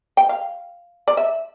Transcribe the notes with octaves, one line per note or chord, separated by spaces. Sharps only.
G5
F5
D5
E5